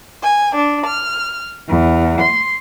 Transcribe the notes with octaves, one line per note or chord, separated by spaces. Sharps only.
G#5
D4
F6
E2
C6